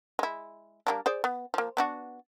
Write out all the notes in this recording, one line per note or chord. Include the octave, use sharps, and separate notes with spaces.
G#3 E4
G3 A#3 D4
G#4 C5 D5
B3
F3 A#3
B3 D4 F#4